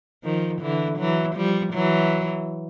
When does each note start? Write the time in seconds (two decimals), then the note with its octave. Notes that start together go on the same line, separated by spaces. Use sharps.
0.24 D#3 F3
0.61 D3 E3
0.99 E3 F#3
1.36 F3 G3
1.73 E3 F#3